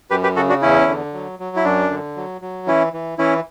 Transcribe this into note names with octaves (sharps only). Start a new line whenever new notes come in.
F#2 G4 B4
G4 B4
C#3 F#4 A4
D4 F#4
E2 C#4 E4
D3
F#3
F#3
E4
F#2 D4
D3
F#3
F#3
E3 C#4 E4
E3
E3 C#4 E4